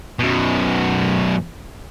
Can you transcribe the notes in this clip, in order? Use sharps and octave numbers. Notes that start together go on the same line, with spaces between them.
F#2 B2